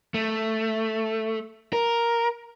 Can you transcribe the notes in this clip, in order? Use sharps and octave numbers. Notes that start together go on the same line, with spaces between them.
A3
A#4